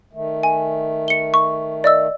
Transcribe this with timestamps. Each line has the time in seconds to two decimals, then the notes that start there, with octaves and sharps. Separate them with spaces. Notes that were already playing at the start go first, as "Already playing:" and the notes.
0.13 D#3 A3
0.43 G#5
1.08 C#7 G7
1.34 C#6
1.84 D5 D#5 E6